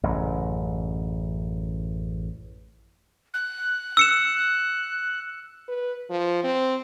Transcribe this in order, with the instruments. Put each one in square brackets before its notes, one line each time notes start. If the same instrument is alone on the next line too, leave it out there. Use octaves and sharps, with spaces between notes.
[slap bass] A1 F#2 C#3
[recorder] F#6
[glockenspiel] E6 C#7 E7
[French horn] B4
F3
C4